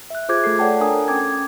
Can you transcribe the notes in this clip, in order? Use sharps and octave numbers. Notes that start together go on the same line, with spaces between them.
E5 F#6
F4 G#4 C5 D6 G6 G#6
A3 A4 C7
A4 C#5 D5 F#5 G5 A5
D4 A#4 G#5 A#5 D#6
C#4 G5 D6 G#6